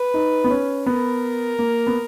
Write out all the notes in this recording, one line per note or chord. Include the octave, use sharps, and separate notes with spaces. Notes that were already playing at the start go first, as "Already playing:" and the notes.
Already playing: B4
D#4
B3
C#4
B3 A#4
A#3
B3